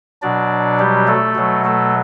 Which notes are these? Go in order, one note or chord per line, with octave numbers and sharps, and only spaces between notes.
B2 F#3 D4 D5
G3 G4
A3 A4
B2 F#3
A3 A4